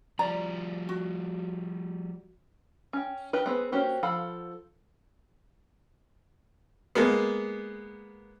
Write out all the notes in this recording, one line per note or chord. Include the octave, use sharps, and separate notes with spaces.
F3 G3 D5 A#5
F#4
C#4 G5
D#3 G4 A#4 B4
B3 C4 G#4 B4
A#3 C#4 F#4 G4 C5
F3 A4 F5 F#5 B5
G#3 A#3 B3